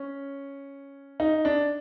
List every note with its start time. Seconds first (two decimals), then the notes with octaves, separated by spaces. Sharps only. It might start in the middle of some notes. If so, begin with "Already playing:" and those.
Already playing: C#4
1.20 D#4
1.45 D4